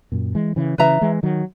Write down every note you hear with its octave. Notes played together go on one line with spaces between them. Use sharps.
F#2 A#2
E3 G#3
C#3 E3
C#3 E3 B4 E5 A#5
E3 G#3
D#3 F#3